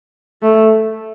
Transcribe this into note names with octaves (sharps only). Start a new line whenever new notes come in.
A3